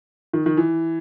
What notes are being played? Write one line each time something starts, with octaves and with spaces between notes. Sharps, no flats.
D#3
D#3
E3